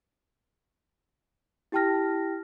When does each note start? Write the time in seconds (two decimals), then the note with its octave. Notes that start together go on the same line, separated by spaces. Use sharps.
1.72 E4 G4 G5 A5 F6 A#6